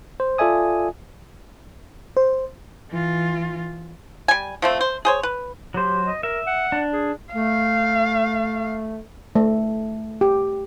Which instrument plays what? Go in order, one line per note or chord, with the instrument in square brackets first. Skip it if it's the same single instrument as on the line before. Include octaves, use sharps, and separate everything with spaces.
[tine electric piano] C5
F4 A4 D5 E5 G#5 D#6
[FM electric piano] C5
[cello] E3 F4
[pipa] G3 G#5
F3 A3 C4
C5
G#4 C5 C#5
B4
[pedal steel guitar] F#3 C5 [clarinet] G4
[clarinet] D#5
[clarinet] A#4 [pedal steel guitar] E5
[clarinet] F#5
[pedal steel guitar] D4
[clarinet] G#4
[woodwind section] A3 [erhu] F5
[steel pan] A3
G4